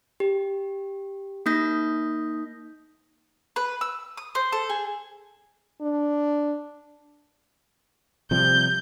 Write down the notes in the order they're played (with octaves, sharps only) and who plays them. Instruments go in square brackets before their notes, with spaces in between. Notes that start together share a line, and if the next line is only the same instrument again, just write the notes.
[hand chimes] G4
A#3 D#4 D#6 G6 A#6 B6
[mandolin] B4
E6
D#6
C5
A4
G#4
[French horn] D4
[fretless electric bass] C3 F3 G3 [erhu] G6